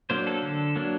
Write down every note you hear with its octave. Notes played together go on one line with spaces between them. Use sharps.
F#3 A#3 D4 C5
A4
D3
F#3 A#3 D4